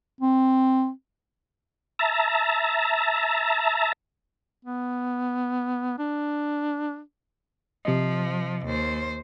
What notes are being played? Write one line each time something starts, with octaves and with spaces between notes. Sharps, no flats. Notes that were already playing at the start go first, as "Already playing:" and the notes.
C4
E5 A5 A#5
B3
D4
C3 F3 D#5
D#2 C5